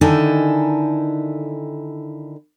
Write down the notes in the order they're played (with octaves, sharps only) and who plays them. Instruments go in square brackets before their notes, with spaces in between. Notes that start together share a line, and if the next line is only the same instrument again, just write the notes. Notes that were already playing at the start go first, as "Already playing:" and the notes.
[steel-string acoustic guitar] D3 D#3 D#4 E4 A4 G#5